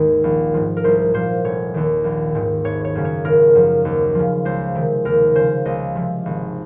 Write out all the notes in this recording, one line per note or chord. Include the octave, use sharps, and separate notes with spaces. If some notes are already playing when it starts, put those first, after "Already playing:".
Already playing: G#1 D#2 G#2 D#3
A#1
G#2 F3
A#4
C2 C5
A#2 F3 C5
F1 C#5
D#2 D#3
A#1
G#2 D#3
G#1 C#5
C#5
F#2 C#3
C#5
G#1 A#4
F#2 F3
D#2
C#3 F3
C#2 C5
C3 D#3
D#2 A#4
C#3 F3 C5
C#2 D#5
C3 F3
G#1